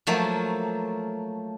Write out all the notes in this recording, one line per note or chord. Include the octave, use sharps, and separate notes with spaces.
F3 F#3 A3 A#3